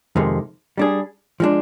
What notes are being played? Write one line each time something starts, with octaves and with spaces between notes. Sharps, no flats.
F2 C3 D#3 G#3
G3 D4 G#4
F3 G#3 D4